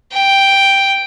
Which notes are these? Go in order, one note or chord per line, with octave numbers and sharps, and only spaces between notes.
G5